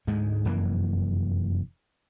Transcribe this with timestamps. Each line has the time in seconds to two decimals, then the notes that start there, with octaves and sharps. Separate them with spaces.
0.07 D2 G#2 G#3
0.45 F1 F#2 E3 A#3